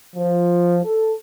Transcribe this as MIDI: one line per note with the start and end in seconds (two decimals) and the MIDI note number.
0.16 0.80 53
0.84 1.14 69